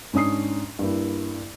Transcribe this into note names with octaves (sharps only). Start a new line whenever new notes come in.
G#2 C#4 D4 D#6 C7
G2 A#3 E4